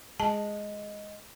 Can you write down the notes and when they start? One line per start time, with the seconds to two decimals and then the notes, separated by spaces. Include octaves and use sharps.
0.20 G#3 A5